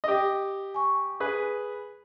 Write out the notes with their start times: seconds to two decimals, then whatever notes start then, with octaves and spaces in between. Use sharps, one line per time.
0.04 G4 D#5
0.75 G#5 C#6
1.20 G#4 B4